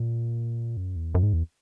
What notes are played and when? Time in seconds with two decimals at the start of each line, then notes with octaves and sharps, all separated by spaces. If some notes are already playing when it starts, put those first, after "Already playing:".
Already playing: A#2
0.77 F#2
0.96 E2
1.15 F#2
1.23 G#2
1.33 E2